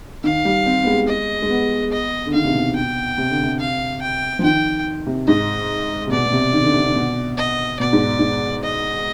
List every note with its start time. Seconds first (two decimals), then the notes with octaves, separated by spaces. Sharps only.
0.24 D#3 F5
0.45 G3
0.66 C4
0.83 B3
0.87 G#3
1.08 D#5
1.42 G#3
1.50 B3
1.92 D#5
2.26 D3
2.34 D#3 F5
2.45 C3
2.55 B2
2.76 G5
3.18 C3
3.31 D3
3.43 C3
3.60 F5
4.01 G5
4.39 F3
4.44 D#3 G5
5.06 C3
5.27 G#2 D#5
6.07 C3
6.12 B2 D5
6.26 B2
6.32 C3
6.53 D#3
6.64 D3
6.74 C3
6.84 D3
6.95 B2
7.37 D#5
7.79 B2 D5
7.93 G#2
8.19 G#2
8.63 D#5